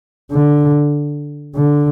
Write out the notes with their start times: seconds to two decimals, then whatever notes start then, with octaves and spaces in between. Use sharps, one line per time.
0.32 D3
1.55 D3